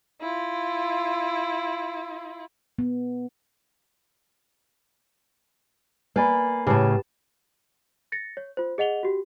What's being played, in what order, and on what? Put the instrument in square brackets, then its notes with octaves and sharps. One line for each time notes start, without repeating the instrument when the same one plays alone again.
[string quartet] E4 F4
[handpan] B3
[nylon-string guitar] A#3 D5 [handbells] B4 G#5 B5
[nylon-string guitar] A2 C#3 [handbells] G4 B4 A5
[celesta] A6 A#6 C#7
C#5
F4 C5
G#4 D#5 F#5 F7 G7
F#4 G4